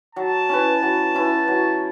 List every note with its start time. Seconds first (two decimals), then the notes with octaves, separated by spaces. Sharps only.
0.16 F#3 A5
0.49 C#4 E4 B4
0.83 F#3
1.15 C#4 E4 B4
1.48 F#3